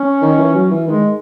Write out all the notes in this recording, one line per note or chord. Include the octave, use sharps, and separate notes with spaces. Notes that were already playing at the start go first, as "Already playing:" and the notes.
Already playing: C#4
D#3
E3
F#3
E3
D#3 G#3